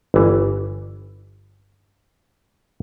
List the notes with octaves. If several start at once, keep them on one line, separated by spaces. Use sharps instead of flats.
G1 E3